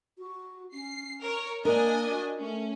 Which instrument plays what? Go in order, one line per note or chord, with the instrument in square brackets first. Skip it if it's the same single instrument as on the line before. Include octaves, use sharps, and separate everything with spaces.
[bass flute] F#4
[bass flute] C#4 [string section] C7
[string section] A#4 C#5
[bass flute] A#3 [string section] D4 D#5 G#5 [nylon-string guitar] A#4
[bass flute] F#4
[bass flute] A3 [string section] C#4